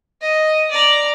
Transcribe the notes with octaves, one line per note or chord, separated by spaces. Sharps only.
D#5
D5 A#5